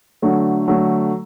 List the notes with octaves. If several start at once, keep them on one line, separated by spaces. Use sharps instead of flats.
D3 F#3 A3
D3 F#3 A3